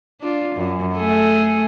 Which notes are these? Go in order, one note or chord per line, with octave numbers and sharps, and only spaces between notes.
D4 F4
F#2
A3 G#4 A4